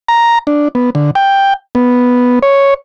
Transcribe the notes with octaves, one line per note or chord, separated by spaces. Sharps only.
A#5
D4
B3
D3
G5
B3
C#5